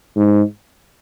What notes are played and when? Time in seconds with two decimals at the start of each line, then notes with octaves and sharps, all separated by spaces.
0.16 G#2